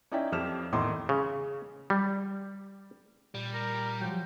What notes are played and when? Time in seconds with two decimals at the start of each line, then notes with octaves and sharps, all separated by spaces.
0.12 C#4 D#4 E4 D5 E5 G5
0.32 F2 F3 G4 F6 E7
0.73 E2 A2 D#3 D#4 C6 D6
1.09 C#3
1.90 G3
3.35 A#2 G3
3.54 A#4
4.01 F3 F#3 G5